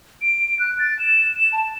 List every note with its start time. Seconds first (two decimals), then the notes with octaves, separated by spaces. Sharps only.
0.22 D7
0.59 F#6
0.79 A6
0.99 E7
1.36 E7
1.53 A5